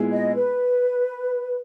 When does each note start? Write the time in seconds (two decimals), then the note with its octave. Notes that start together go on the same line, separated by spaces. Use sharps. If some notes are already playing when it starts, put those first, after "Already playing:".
Already playing: A#2 G#3 B3 E4 G#4
0.12 D#5
0.35 B4